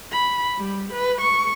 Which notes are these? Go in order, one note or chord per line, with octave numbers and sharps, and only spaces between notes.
B5
G3
B4
C#6